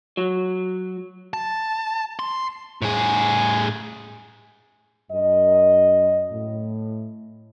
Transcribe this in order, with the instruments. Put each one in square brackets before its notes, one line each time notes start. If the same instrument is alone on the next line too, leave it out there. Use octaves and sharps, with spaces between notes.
[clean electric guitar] F#3
[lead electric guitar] A5
C6
[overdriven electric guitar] A2 G#4
[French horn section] F#2 D#5
A2